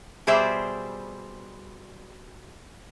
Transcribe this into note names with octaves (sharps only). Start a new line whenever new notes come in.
B2 G3 G#4 C5 D5 E5